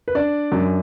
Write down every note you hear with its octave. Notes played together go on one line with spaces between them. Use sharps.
B4
D4 D5
F#2